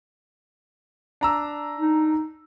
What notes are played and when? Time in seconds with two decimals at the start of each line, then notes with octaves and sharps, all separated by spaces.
1.21 D4 A#5 E6
1.79 D#4